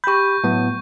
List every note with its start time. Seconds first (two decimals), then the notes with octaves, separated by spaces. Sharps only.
0.04 G4 B5 C#6 G6
0.44 A2 F#3 B3